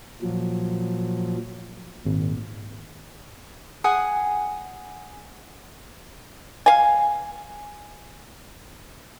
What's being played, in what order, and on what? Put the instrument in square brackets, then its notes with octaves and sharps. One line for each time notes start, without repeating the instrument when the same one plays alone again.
[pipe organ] A#2 F3 F#3
[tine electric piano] G#1 [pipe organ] A#2
[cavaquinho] G#4 F#5 G#5 D#6
[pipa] F5 G#5